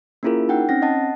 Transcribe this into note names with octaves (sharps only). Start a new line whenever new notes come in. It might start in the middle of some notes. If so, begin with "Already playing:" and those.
A#3 C#4 E4 F4 G#4 A#4
D#4 F#5 G5
C4 C#4 F#5 A#6
D#5 F#5 A5